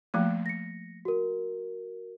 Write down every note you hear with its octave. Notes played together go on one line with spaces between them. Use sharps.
F3 A3 A#3
A#6 C#7
F#4 A#4